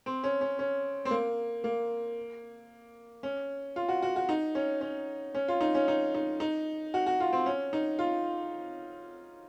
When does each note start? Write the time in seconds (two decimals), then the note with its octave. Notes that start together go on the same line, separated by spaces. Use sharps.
0.06 C4
0.24 C#4
0.41 C#4
0.59 C#4
1.05 C4
1.11 A#3
1.64 A#3
3.23 C#4
3.76 F4
3.89 F#4
4.03 F#4
4.16 F#4
4.29 D#4
4.55 C#4
4.81 C#4
5.35 C#4
5.48 F4
5.61 D#4
5.75 C#4
5.88 D#4
6.15 D#4
6.40 D#4
6.94 F#4
7.07 F#4
7.20 F4
7.33 C4
7.46 C#4
7.73 D#4
7.99 F4